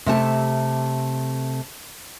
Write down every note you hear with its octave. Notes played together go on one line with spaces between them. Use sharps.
C3 A3 A5